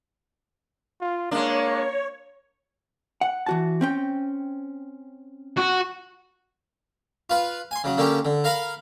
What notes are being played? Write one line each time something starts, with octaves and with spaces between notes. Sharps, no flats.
F4
G#3 A#3 D4 C#5
F#5
E3 F#4 A5
C4 C#4 G5
F#4
F4 B4
G#5 C6
C#3 F#3
D3 A#3 C#4 G4
D3
A#4 F5 A#5 B5